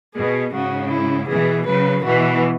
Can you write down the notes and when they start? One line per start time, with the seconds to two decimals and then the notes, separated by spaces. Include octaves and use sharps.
0.15 B2 G#4
0.53 G#2 C#3 F#4
0.90 E4
1.28 B2 E3 G#4
1.66 C#3 F#3 B4
2.04 B2 E3 F#4